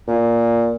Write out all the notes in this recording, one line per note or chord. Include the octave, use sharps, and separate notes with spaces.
A#2